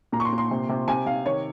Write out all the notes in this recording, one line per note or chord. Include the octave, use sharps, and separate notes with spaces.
A#2 A#5
C#6
C6
A#2
C6
C3
C3
C3 G#5
C3 F5
D#3 C#5